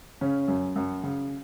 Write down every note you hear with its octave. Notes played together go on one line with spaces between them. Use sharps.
C#3 C#4
F#2
F#2
C#3